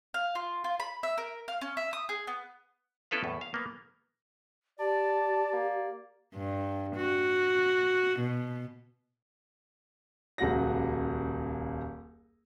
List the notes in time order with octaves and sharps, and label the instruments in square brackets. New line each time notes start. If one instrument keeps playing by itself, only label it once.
[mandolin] F5
F4
F4
B5
E5
A#4
F5
C#4
E5
D#6
G#4
B3
[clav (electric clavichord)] B3 C#4 E4 A4 B4 F5
E2 A2
F5
A#3 B3
[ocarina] G4 [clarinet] D5 [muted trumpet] A5
[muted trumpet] A#3
[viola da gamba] G2
F#4
B2
[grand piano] D#1 C#2 F#3 F#5 A#6